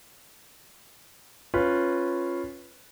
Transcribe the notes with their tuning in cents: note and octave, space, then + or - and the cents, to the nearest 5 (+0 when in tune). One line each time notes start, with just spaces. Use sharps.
C#4 -10 F4 +0 B4 +0